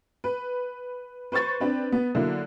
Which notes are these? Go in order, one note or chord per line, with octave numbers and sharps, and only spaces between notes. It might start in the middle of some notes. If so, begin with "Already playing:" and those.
B4
B4 C5 C#6 A6
C4 D4 B4
B3
D3 F#3 A#3 D4 E4